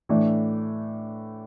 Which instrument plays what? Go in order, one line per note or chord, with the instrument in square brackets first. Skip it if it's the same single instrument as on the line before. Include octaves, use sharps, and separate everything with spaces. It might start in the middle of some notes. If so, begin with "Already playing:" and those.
[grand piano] A2 E3 A3 D4